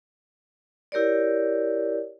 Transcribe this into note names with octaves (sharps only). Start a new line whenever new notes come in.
E4 G4 A#4 C#5 D5